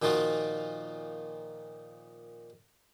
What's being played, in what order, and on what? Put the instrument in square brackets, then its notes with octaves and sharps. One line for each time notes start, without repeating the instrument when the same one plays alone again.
[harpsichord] A#2 D#3 F3 D#4 F4 F#4